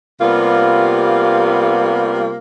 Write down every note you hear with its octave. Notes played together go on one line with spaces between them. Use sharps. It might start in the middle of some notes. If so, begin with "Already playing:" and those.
C3 G3 A#3 B3 F4